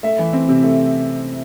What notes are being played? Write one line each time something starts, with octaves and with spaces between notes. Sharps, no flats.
A3 E5
E3
C4
C3
A3